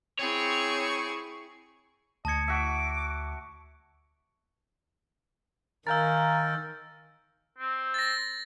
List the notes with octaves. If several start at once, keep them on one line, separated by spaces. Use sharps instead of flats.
C4 E4 G#4 C#5 C#6
D2 D#5 A5 G#6 C#7
F#4 E5 D6
D#3 A#4 F5 G#5 A#5 E6 G6 A6
C4
A6 A#6